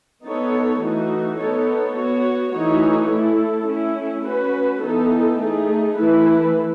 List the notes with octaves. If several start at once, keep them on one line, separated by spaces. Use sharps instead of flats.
B3 D#4 A4 C#5
E3 A3 D#4 F#4
B3 D#4 A4 C#5
B3 F#4 C#5
E3 A3 D#4 F#4 C#5
A3 E4 A4
A3 C#4 E4
C#4 F#4 B4
E3 B3 D#4 A4
A3 D#4 G#4
E3 A3 E4 B4